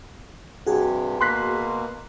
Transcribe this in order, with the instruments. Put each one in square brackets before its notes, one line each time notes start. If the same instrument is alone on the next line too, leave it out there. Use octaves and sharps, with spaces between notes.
[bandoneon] G2 C3 [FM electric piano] F#4 G#4
[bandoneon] B2 A#3 [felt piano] C6 F#6 B6